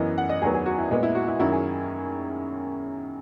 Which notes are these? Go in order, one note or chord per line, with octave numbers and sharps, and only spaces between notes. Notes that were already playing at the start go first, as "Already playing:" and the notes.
Already playing: F#2 E3 B3 D#5
F#5
D#5
E2 D#3 F#3 B3 G#4
G#4
F#4
E4
A#2 G#3 B3
E4
F#4
E4
F#2 D#3 F#3 C#4 E4
G#4